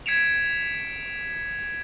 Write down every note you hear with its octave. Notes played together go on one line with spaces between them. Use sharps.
G#6 B6 C#7 D7 E7 F7